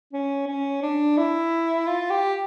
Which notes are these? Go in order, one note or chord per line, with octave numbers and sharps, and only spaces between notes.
C#4
C#4
D4
E4
F4
G4